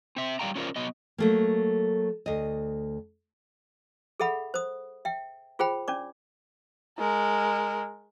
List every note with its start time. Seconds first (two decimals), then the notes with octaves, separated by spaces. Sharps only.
0.16 C4 E5
0.39 G3 B3 D5 F5 G5 A#5
0.55 C#4 D4 F4 A#4 C5 D5
0.76 F#3 B3 D#5
1.18 F#3 A3 A#3
2.26 D2 D#5
4.20 G#4 A4 E5 F#5 B5
4.54 C5 D#6
5.05 E5 G5
5.59 F4 G#4 C5 G5 B5
5.88 C#4 D4 D5 D6
6.98 G#3 A#4